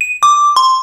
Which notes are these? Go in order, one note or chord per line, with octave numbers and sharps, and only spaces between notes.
D#7
D6
C6